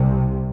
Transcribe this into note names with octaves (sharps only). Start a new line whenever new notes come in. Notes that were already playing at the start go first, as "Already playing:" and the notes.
Already playing: C2 C3